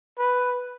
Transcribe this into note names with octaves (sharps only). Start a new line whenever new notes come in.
B4